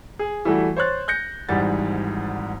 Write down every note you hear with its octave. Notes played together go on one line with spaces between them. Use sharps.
G#4
E3 G3 A3 E4 F#4
C5 C#5 C6 F#6 A6
F#6 G6 A#6 C#7
G#1 G#2 E3 G3 F#5 A6